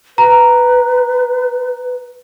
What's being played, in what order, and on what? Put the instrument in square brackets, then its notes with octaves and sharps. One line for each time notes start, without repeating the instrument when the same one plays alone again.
[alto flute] B4 [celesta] A#5